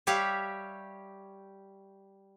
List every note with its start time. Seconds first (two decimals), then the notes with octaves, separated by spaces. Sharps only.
0.07 G3 G4 C#5 E5 F5